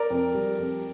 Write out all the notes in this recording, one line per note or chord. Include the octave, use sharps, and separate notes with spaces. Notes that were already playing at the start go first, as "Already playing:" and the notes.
Already playing: A#4 D5
F2
G3
F2